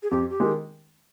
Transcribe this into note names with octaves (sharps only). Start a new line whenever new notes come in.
G#4
F2 G4
G4
D#3 G#3